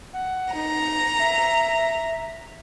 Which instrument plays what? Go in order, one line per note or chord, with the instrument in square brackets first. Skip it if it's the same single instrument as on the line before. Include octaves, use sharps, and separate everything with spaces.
[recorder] F#5
[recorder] D#4 [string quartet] A#5
[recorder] E5